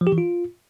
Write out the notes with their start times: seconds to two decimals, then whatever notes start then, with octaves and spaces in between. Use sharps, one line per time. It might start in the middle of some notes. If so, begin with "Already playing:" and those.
0.01 F3
0.07 G4
0.12 E3
0.18 F4